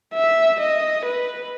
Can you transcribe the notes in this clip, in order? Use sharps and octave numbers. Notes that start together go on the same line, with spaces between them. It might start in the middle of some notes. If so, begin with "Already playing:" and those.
E5
D#5
B4